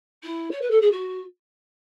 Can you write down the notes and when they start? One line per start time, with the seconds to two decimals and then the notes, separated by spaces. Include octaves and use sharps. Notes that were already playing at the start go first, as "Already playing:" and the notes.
0.23 E4
0.51 C#5
0.61 B4
0.70 A4
0.81 G#4
0.91 F#4